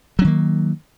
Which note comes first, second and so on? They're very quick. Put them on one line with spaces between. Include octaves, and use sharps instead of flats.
F#3 C#4 D#3 A#3